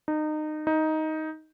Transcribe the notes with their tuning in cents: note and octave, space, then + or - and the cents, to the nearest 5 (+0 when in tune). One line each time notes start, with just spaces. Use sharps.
D#4 -25
D#4 +10